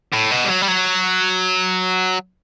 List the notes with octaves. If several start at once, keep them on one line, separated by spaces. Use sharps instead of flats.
A2
B2
G3
F#3
G3
F#3